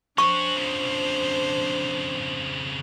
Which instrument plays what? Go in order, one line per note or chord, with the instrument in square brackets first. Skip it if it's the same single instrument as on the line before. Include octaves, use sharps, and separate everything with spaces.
[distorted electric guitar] C#4 F#4 [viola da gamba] D4 C5 [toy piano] C#6
[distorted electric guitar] F2 C#3